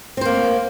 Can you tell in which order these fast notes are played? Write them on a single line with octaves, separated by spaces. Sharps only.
C4 C5 A#3